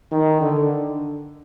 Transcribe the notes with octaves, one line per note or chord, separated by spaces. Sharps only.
D#3
D3